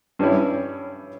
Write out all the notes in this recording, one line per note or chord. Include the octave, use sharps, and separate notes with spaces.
G2 G3 C#4 E4